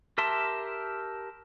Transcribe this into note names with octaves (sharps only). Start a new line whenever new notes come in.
G4 A#4 E5 A5 C6